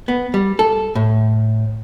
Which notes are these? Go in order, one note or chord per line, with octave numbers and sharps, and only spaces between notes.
B3
G3
A4
A2